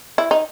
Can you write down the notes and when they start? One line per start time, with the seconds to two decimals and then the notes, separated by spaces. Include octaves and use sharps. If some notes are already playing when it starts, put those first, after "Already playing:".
0.18 E4
0.31 D#4